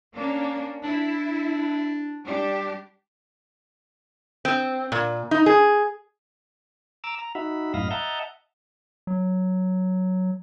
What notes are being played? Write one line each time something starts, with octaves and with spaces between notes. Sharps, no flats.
A#3 C#4 D4
D4 E4
G3 D4 G4
C4
A#2
D#4
G#4
A#5 D6 E6
A#5
D#4 F#4 E5 B5
F#2 A2 D#5 F5 B5 A#6
D#5 E5 F#5 A5 A#5 G6
F#3